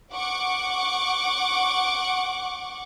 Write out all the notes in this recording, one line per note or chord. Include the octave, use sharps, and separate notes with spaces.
F#5 C#6 D6